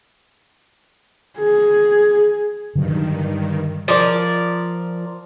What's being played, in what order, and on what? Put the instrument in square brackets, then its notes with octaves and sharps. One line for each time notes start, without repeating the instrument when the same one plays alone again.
[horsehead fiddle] G#4
[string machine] G2 D#3 [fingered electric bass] D3 F#3
[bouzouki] F3 A#4 D5